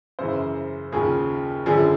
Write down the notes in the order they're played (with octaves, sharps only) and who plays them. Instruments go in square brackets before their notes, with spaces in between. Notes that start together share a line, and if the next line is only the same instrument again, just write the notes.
[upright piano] F#2 C#3 E3 C5
D#2 C#3 F3 G#4
F#2 D3 F3 G#4